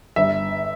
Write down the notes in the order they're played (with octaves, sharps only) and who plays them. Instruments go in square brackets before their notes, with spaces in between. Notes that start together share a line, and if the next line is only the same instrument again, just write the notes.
[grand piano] G1 E5